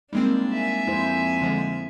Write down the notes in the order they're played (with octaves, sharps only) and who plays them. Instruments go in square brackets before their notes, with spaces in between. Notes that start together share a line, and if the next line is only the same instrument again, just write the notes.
[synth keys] G3 G#3 C4 [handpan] A#3 D#4 [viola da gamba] D4
[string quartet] E5 G#5
[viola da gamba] F2 [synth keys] G#3 [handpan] E4 C5
[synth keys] D3 F3 G#3